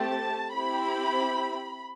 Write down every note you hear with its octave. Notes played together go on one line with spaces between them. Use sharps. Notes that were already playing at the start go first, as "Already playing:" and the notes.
Already playing: A3 C4 G4 A5
C4 E4 G4 B5